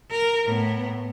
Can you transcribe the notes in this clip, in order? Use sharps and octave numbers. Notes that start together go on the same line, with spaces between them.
A#4
A2 B3